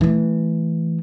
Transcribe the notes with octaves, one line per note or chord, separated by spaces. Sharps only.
E3 A3